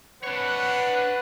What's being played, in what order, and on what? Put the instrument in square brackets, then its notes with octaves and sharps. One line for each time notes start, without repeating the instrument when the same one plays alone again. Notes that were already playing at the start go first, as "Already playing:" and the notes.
[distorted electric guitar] D4 C#5 [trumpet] B4 [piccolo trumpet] F#5